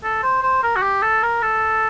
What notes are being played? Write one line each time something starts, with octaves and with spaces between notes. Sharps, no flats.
A4
C5
C5
A#4
F#4
G4
A4
A#4
A4